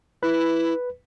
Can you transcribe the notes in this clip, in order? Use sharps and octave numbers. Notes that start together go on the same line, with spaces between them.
E4 B4